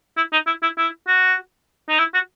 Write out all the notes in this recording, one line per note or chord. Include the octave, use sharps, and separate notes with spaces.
E4
D#4
E4
E4
E4
F#4
D#4
E4
F#4